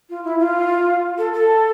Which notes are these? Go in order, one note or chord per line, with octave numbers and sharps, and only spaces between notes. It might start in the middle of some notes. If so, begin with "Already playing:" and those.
F4
E4
F4
A4
A4